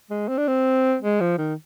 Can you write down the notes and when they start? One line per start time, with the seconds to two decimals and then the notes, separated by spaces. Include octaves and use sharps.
0.10 G#3
0.28 C4
0.38 D4
0.48 C4
1.02 G#3
1.20 F3
1.38 D#3